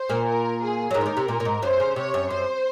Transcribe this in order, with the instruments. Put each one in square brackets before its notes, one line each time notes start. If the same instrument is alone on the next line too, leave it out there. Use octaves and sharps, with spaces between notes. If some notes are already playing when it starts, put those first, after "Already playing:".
Already playing: [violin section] C5
[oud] A#2 A#3
[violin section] A#4
G#4
[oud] F#3
[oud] G#2 G#3 [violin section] A#4
[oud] F3
D#2 D#3
C3
A#2
A#2
G#2
[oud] F#2 [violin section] C5
[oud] C#3
[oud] C3 [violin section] C#5
[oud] F#2
[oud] F#2 [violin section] C5